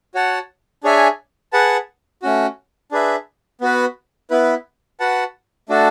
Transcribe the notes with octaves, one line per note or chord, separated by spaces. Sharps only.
F#4 C#5 F#5 A5
D4 G#4 C#5 E5 G#5
G#4 B4 F#5 A5
A3 C#4 F#4
D4 G#4 B4 E5
B3 F#4 B4
B3 E4 B4
F#4 B4 F#5 A5
A3 D4 F#4 A4